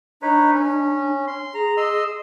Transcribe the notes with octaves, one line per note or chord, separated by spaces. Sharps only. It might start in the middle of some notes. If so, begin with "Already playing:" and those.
D4 D#4 B4 C#5
C#4
C6
G#4 A#5
D#5 C6 E6